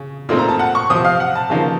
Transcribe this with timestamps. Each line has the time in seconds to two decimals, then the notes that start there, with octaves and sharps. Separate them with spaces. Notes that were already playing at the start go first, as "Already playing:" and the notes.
Already playing: C#3
0.29 A#2 A3 C4 D#4 A4 C6
0.38 A#5
0.49 A5
0.59 F#5
0.75 C#6
0.90 C3 F3 C4 D#6
1.05 F5
1.20 F#5
1.35 A5
1.50 C#3 F3 A#3 D#4